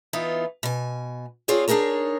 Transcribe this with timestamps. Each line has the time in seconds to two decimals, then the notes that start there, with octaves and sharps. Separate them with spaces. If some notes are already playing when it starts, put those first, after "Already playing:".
0.13 E3 B3 D#4 F4
0.63 B2 G#5
1.48 C4 F4 G#4 C#5 D5
1.68 D4 D#4 G#4 A#4 C#5